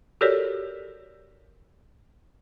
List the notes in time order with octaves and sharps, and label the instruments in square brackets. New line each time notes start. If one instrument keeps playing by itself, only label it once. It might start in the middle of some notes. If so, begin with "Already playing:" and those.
[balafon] F#4 G4 A4 A#4 C#5 D5